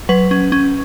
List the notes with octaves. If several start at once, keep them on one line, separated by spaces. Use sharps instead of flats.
F#3 B4
C#4
C#4